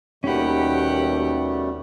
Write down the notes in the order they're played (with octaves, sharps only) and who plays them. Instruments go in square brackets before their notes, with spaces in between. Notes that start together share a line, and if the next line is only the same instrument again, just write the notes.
[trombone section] D#2 [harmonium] B2 G3 A3 [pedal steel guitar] C#4 B5 [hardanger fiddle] G4 F#5